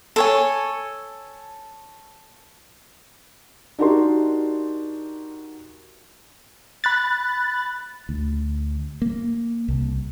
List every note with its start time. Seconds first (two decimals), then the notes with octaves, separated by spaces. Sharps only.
0.16 A4 C#5 G#5
3.79 D4 D#4 F#4 G4 A#4 C6
6.84 B5 F#6 A6
8.09 D2
9.02 A#3
9.68 C2